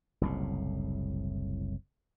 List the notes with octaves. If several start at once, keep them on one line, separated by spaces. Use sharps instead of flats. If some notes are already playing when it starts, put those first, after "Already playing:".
F#1 C2 A2